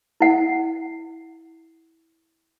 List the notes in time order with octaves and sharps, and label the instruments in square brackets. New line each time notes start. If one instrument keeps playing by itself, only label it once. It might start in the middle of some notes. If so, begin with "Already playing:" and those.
[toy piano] E4 F#5